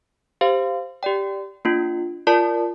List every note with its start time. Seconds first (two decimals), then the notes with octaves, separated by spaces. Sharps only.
0.41 G4 C5 F5
1.03 G4 D5 G5
1.65 A#3 D4 F4
2.27 F4 A#4 D5 A5